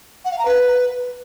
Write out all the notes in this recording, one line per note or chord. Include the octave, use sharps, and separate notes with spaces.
F#5
F5
A#5
B4